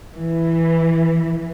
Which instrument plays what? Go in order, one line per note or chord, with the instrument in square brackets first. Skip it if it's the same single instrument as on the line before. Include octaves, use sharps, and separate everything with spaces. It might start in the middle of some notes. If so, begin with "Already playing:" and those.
[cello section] E3